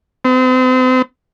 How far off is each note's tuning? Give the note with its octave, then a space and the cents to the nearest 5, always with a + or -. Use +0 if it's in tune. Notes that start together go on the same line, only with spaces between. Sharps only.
C4 -40